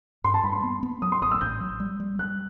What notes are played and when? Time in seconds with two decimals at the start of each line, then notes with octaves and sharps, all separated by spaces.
0.24 G2 C6
0.34 A5
0.43 G2 B5
0.53 C6
0.64 B3
0.83 B3
1.02 F#3 D#6
1.12 C6
1.22 A1 D#6
1.31 E6
1.41 A1 G6
1.60 F#3
1.80 G3
2.00 G3
2.19 G3 F#6